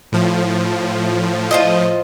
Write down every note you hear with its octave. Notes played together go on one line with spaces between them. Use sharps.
A2 F3
F4 C5 D#5